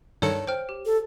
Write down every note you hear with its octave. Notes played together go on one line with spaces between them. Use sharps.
G2 D#3 A4 C#5 C#7
C5 G5 F6
G4
A4